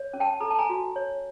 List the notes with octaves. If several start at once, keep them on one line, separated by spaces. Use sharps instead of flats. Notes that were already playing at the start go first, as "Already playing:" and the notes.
Already playing: C#5
C#4
G5 A5
A4 A#5
A5
G#5 A#5
F#4
C#5